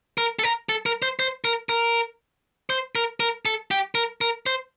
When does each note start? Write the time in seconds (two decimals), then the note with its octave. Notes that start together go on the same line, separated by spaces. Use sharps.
0.18 A#4
0.39 A4
0.44 A#4
0.69 A4
0.86 A#4
1.02 C5
1.19 C5
1.45 A#4
1.69 A#4
2.70 C5
2.95 A#4
3.20 A#4
3.46 A4
3.71 G4
3.95 A#4
4.21 A#4
4.46 C5